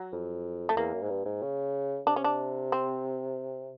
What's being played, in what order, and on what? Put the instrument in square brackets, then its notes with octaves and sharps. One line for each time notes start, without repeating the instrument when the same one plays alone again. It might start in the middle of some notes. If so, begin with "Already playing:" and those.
Already playing: [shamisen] F#3
[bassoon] F2
[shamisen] A3
[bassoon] E2 [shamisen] A#3
[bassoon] F#2
G#2
G2
G#2
C#3
[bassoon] C3 [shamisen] D4
[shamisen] C#4
D4
C4